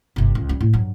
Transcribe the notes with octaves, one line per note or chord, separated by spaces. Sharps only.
G1 C3
C#2
G3 C#4
A2
G2 F#3